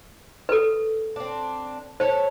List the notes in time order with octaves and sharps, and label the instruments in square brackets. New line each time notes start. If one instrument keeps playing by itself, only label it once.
[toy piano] A4 B4
[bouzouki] C4 D4
[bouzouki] A4 C#5 [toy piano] C5